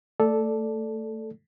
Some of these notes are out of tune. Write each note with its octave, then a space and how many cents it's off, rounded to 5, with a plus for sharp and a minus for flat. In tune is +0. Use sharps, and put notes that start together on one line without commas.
A3 +20 A4 -5 D5 +0